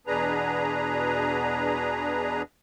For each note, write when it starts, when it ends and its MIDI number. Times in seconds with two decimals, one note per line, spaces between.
0.07 2.42 40
0.07 2.42 47
0.07 2.42 62
0.07 2.42 68
0.07 2.42 71
0.07 2.42 82